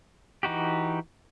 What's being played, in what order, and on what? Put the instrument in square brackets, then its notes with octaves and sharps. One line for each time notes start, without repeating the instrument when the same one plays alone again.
[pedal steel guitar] E3 D#4 F#4 G4